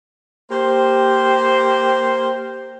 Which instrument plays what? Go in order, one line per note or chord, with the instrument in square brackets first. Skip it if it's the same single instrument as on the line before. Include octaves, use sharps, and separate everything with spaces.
[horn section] A#3 G4 C5